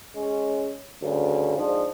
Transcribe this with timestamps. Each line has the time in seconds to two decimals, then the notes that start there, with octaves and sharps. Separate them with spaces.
0.15 G#3 C#4
1.02 D2 G2 C#3
1.58 G#2 F3 D4